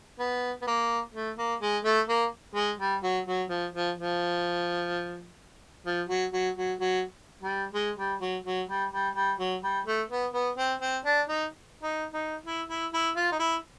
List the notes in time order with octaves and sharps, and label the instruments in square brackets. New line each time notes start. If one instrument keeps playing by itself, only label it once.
[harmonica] B3
B3
A#3
A3
A#3
G#3
A3
A#3
G#3
G3
F#3
F#3
F3
F3
F3
F3
F#3
F#3
F#3
F#3
G3
G#3
G3
F#3
F#3
G3
G3
G3
F#3
G3
A3
B3
B3
C4
C4
D4
D#4
D#4
D#4
E4
E4
E4
F4
D#4
E4